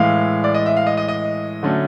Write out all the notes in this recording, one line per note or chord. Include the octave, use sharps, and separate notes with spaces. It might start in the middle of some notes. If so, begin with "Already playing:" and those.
Already playing: A2 E3 G#3 F5
D5
D#5
E5
F5
D#5
D#5
D#5
D3 F#3 A3 C#4